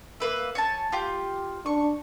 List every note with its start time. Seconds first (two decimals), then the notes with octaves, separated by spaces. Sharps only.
0.20 A#3 B4 E5
0.55 C#5 G#5 A5
0.92 F4 G4
1.66 D4 C#6